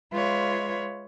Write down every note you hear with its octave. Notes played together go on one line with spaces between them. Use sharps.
G#3 F4 B4 C#5 E5 F5